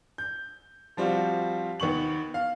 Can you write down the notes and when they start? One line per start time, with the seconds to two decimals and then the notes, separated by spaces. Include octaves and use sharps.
0.18 G6
0.97 F3 G3 C4 F4 F#4
1.80 D#2 B3 C#6 F#7
2.34 F5